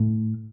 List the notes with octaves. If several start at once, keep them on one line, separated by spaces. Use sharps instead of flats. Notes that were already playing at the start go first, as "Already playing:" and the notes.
Already playing: A2